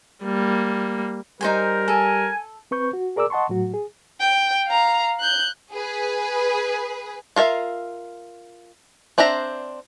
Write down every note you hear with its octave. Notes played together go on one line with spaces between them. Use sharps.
G3 A#3
G3 D#4 A#4 C5 G#5
A4 G#5
C4 B4 C#6 G6
F#4
G#4 A#4 D5 D6 E6
D#5 F#5 A5 C6 C#6
A2 F#3 F#4
G#4
G5
F5 A#5
F#6 G6
G#4 B4
F4 A#4 C#5 E5 F5
C4 D4 C5 E5 A#5